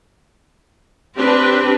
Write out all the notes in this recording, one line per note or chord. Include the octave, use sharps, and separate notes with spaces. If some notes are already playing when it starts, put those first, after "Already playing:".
C4 D4 G4 B4